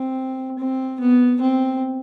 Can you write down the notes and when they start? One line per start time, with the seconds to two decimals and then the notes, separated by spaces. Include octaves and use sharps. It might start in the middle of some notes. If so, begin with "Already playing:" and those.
Already playing: C4
0.59 C4
1.00 B3
1.41 C4